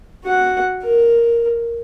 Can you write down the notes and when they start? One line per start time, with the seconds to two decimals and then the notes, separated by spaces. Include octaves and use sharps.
0.25 F#4 F#5
0.83 A#4